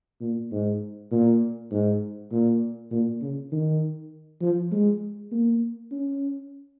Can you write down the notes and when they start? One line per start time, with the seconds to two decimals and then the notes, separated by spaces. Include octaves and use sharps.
0.21 A#2
0.51 G#2
1.12 A#2
1.71 G#2
2.32 A#2
2.91 A#2
3.22 C#3
3.52 D#3
4.42 F3
4.72 G#3
5.32 A#3
5.92 C#4